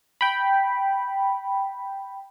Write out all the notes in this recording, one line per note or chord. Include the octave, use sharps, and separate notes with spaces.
G5 B5